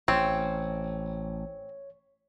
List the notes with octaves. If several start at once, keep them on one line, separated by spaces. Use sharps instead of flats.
A1 C4 C#5